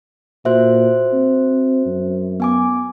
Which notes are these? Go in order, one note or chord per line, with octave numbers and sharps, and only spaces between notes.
A#2 F#4 C5 E5
C4
F#2
B3 G#5 D6